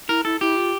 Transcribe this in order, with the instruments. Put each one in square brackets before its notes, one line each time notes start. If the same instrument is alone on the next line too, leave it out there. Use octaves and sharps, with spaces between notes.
[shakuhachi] E4 [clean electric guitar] A#4
[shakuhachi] E4 [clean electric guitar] A4
[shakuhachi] E4 [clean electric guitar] G4
[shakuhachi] F4